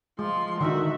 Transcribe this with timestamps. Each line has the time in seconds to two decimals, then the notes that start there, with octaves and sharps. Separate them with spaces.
0.19 F3 G#3 C6
0.61 D3 D#3 D#4 F#4 E5